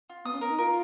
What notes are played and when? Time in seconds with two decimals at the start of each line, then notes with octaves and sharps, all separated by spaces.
0.10 F4
0.25 B3 D#6
0.33 C#4
0.41 B3 A#4
0.50 D#4
0.58 F4 A#4